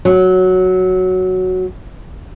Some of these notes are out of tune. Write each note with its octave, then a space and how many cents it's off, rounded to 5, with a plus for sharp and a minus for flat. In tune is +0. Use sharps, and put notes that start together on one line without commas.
F#3 +0